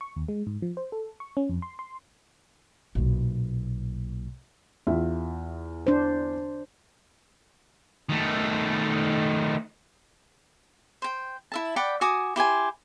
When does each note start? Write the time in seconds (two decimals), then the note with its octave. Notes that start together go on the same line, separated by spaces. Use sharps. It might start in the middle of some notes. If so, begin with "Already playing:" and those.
0.01 C#6
0.16 D#2
0.28 G#3
0.47 G#2
0.62 F3
0.77 C5
0.92 A4
1.20 C#6
1.37 C#4
1.49 F2
1.62 C6
1.79 C6
2.95 B1 A#2
4.87 E2 F4 E5
5.87 D4 C5
8.09 D#3 A3
11.02 C5 G5
11.52 E4 E5 A5
11.76 D5 F#5 G5 B5
12.01 F#4 G#5 D6 D#6
12.36 E4 G4 C5 G#5